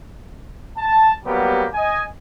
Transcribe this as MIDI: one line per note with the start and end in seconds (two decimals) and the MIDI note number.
0.78 1.12 81
1.25 1.67 54
1.25 1.67 55
1.25 1.67 58
1.25 1.67 59
1.25 1.67 67
1.74 2.03 75
1.74 2.03 80